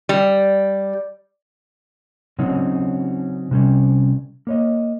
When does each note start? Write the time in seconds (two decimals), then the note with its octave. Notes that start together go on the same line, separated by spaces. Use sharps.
0.09 G3
2.39 C#3 F#3 C4 C#4 D#4 F#4
3.51 C3 G3 C#4
4.47 A#3 C#5 D#5